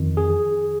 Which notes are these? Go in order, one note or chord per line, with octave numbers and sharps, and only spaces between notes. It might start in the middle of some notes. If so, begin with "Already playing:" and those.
Already playing: F2 D#3
G#4